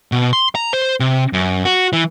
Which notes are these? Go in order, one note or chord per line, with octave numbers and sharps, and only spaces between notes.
B2
C6
A#5
C5
C3
F#2
F#4
E3